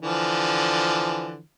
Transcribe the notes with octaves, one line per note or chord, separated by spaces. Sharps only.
D3 E3 F3